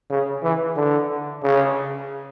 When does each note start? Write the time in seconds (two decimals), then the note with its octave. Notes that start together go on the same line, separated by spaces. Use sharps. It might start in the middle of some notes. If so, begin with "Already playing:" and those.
0.10 C#3
0.43 E3
0.76 D3
1.43 C#3